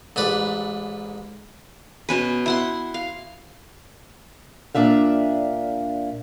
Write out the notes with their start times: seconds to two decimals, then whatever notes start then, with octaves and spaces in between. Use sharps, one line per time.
0.16 A1 G#2 B4 D5
2.09 B2 C#4 B4
2.46 E4 F#5 C6
2.94 F5
4.74 A#2 D4 E5 F5